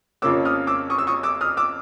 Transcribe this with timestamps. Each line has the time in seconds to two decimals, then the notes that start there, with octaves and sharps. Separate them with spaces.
0.22 F2 C#3 F3 A#3 C#4 D6 E6
0.45 D#6 F6
0.67 D6 E6
0.90 C#6 D#6
0.98 E6
1.07 C#6 D#6
1.23 D6 E6
1.41 D#6 F6
1.57 D6 E6